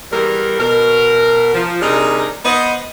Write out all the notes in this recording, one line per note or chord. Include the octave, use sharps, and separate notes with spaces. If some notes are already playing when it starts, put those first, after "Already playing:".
E2 G3 A#4
B2 A#4
F3
C3 G3 D4 D#4 G#4 A#4
B3 B4 C5 D#5